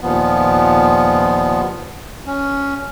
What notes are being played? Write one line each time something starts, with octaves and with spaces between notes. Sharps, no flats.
D#2 A#2 F3 B3
C#4